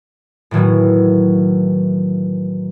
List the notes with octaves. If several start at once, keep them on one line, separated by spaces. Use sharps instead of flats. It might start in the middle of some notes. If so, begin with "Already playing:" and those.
A2 D#3 E3 F#3